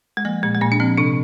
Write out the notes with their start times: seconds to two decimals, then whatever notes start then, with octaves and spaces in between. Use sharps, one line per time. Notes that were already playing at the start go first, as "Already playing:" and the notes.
0.17 G#3
0.25 F3 A#3
0.43 A#2 G#3
0.55 G#3
0.61 A#2 A#3
0.72 D4
0.80 F3 C4
0.98 C3 D4